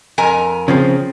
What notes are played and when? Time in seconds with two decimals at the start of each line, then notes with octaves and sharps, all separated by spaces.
0.18 F2 A#4 G#5
0.68 C#3 F3 C4